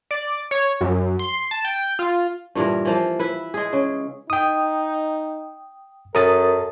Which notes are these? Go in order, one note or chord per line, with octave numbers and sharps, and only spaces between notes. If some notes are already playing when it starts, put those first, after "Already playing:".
D5
C#5
F#2
C6
A5
G5
F4
G2 A#2 E3 A#4
E3 F3 A#3
E4 B4
G#3 G#4
C#3
D#4 G5 D#6
F#2 A4 A#4 D#6 A6